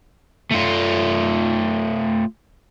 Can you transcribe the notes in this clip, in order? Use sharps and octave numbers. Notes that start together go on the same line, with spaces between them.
A3 F4